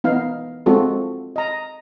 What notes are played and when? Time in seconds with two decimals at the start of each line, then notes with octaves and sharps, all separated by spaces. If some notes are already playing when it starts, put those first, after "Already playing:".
0.04 B3 D#4 F5
0.66 G#3 C4 F4 F#4 A4
1.36 D#5 A#5